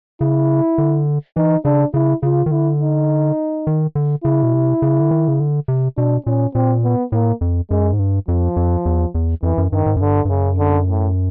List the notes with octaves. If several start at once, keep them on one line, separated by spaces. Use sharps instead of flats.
C#3 E4
D3
E3 D#4
C#3 D4
C#3 E4
C#3 F4
D#3
D3 E4
D#4
D#3
D3
C#3 E4
B2
C3
C#3
D3
D#3
C#3
D3
C3
B2 D4
A#2 C#4
A#2 C4
B3
A2 A#3
F2
F#2 G#3
G#2
G2
F2 F3
F2
E2
E2
F2 E3
F#2
G2 D#3
G#2
F#2
G2 D3
G2
F#2 C#3
D3
A2